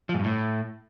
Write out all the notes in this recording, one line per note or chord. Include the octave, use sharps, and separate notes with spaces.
F3
G#2
G2
A2